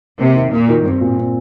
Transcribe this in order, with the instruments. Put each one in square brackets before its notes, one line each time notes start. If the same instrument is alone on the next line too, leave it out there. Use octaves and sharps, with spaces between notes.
[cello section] C3 [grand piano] A#3
[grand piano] D#3
[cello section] A#2 [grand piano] A#3
[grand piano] D#3
[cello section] G2 [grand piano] C4
[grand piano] A#2
C4